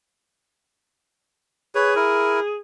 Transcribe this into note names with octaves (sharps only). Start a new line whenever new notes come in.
G#4 B4 C#5
E4 A#4